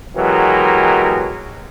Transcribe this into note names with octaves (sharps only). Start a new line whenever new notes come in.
B2 E3 F#3 G#3 G4 A#4